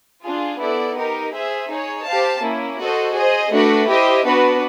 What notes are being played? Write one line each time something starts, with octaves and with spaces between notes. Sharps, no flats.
D4 F4 G#4
B3 E4 A4 D5
D#4 G4 A#4
G#4 C5 E5
D#4 G#4 C#5
G4 C5 F5 A5
A#3 C#4 E4
F#4 A4 C5 D#5
G#4 C5 D#5
A3 D4 F#4 B4
E4 G4 C5 D#5
B3 D4 F#4 B4